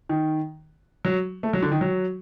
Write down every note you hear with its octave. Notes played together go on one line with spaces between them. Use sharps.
D#3
F#3
A3
F#3
D3
D#3
F#3